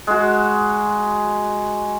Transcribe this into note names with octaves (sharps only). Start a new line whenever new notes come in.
G#3 F#4